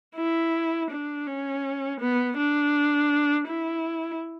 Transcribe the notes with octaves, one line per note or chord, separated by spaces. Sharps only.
E4
D4
C#4
B3
D4
E4